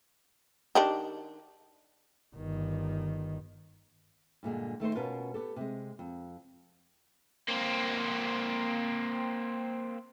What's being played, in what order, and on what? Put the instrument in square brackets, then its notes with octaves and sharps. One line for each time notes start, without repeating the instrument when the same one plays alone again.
[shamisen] D#3 D4 G4
[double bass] G1 D#3
[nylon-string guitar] G2 A#2 D3 G#3
D#3 A3 D#4 C5
B2 C#4 F4 A#4 B4 A5
B3 G4 A4
C3 G#3
F2
[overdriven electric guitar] A#3 C4